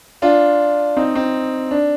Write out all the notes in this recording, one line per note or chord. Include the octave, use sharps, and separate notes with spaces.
D4 F4
C4 D#4
C4 D#4
D4